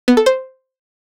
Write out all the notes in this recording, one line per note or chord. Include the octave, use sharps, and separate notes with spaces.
B3
A4
C5